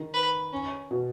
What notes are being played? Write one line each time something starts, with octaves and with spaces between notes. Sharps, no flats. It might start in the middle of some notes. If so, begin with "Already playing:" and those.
Already playing: D#3
B4
C#4
B2